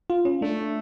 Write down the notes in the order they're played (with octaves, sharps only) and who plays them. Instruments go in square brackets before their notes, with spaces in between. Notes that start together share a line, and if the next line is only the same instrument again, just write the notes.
[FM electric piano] F4
C#4
[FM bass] A3 [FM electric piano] D4